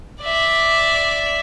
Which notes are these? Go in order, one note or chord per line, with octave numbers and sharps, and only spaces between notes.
D5 E5